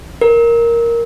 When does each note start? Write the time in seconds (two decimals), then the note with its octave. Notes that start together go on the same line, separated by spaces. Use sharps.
0.21 A#4